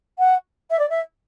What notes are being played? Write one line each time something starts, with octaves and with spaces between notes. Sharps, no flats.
F#5
E5
D5
E5